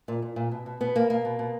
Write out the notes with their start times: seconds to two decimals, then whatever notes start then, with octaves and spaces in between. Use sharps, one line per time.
0.08 A#2
0.22 A#2
0.36 A#2
0.51 B2
0.66 B2
0.81 B2 B3
0.95 B2 A#3
1.10 B2 A#3
1.25 B2
1.39 B2